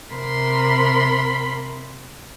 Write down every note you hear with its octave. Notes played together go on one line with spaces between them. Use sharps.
C3 A#4 B5 C6